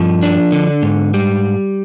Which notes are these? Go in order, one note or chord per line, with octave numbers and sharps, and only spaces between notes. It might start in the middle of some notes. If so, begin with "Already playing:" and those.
Already playing: G2 F3
D4
D3
G#2
G3